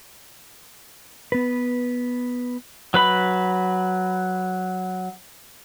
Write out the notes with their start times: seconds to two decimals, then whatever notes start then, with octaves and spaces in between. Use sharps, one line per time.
1.32 B3 B4
2.94 F#3 B4 B5